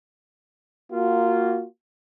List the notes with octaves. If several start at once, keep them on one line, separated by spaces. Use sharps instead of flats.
A#3 F4 F#4